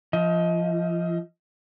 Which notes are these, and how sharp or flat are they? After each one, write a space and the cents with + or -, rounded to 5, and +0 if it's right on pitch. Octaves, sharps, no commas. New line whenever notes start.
F3 -20 D#5 +25